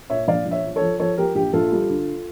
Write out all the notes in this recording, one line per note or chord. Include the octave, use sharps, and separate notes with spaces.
A#2 C#5 E5
A#1 D5 F5
A#1
C#5 E5
F3
A4 C#5
F3
F3 A4 C#5
F3 G4 A#4
A#1 G4
A#1 F4 A4
G3
D3